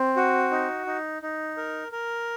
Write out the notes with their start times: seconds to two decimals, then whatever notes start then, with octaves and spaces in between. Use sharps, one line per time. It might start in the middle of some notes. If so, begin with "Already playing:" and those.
Already playing: C4
0.16 F#4
0.51 D#4
0.87 D#4
1.22 D#4
1.57 A#4
1.92 A#4